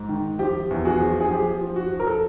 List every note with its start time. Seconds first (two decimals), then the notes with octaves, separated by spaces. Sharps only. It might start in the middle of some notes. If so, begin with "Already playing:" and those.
Already playing: G#2
0.09 D#3
0.39 F3 G4
0.71 E2
0.85 F#4 G#4
1.00 F3
1.21 G#4
1.31 F3 G4
1.61 F3
1.76 F#4
1.91 F3
2.00 A#4
2.07 A4